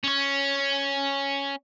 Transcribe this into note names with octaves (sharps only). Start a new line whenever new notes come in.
C#4 C#5